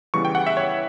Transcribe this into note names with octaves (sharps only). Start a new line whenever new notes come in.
C#3 E3 G3 B3 C#6
G5
F#5
E5
C#5